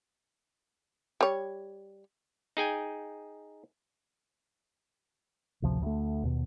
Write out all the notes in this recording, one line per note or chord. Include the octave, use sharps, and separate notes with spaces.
G3 C#5
D#4 G#4 G5 G#5
A1 D2 C3 F3
D2 A3
D#2 B2